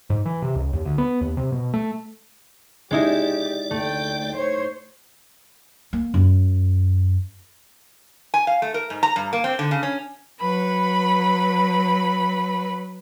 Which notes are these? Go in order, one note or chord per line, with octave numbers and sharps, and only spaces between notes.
G#2
E3
C3
C#2
D#2
D2
B3
D#2
C3
B2
A3
G#3 D#4 E4 G4 D5
D2 A3 G5
C5 C#5
A#3
F#2
G#5
F5
A3
A#4
G#2
A#5
G2
A#3
C4
D3
C#3
C#4
F#3 B4 B5